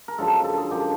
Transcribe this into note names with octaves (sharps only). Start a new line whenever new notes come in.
A#4
F#2 D3 F3 G#3 A4
A4
G#4
F#2 D3 F3 G#3 G4